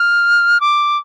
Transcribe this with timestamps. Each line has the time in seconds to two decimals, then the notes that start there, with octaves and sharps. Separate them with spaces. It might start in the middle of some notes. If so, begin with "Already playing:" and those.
Already playing: F6
0.61 D6